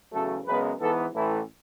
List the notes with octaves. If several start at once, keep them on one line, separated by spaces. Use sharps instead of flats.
E2 C#3 F#3 A3 A4
F#2 C#3 G#3 B3 B4
G#2 E3 B3 A4
A1 A2 E3 A3 E4